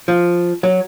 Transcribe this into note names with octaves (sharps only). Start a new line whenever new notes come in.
F3
F#3